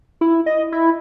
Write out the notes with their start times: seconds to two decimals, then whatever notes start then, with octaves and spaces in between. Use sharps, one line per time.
0.21 E4
0.46 D#5
0.72 E4